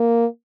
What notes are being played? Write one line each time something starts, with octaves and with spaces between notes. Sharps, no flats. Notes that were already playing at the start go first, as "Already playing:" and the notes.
Already playing: A#3